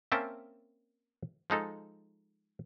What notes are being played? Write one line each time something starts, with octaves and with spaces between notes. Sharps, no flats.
A#3 C4 C#4 E5 G5 A5
F3 G#3 D#4 A4